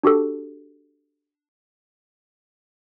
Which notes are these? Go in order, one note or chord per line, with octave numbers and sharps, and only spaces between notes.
D4 F#4 G4 A4